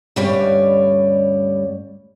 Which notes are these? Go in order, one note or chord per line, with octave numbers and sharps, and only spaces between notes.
D2 G2 G3 C#4 C#5 D5